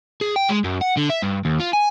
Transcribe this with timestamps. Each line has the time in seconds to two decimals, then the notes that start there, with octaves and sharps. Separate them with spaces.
0.21 G#4
0.36 G5
0.49 G#3
0.64 F#2
0.82 F#5
0.98 D3
1.10 E5
1.23 G2
1.45 D#2
1.60 F4
1.73 G#5